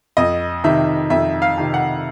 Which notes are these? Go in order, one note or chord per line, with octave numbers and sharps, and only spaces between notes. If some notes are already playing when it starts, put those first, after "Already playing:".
F2 D#5
C3 D#3 E5
F2 E5
F5
C3 D#3
F#5